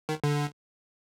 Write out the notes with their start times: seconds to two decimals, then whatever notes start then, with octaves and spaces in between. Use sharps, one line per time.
0.09 D#3
0.24 D3